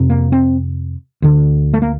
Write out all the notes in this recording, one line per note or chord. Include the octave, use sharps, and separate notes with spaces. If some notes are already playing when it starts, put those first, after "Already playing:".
Already playing: F2 C3
A#3
C4
D2 D3
A3
A#3